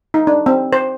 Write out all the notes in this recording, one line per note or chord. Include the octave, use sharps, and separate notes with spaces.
D#4
D4
C4
C5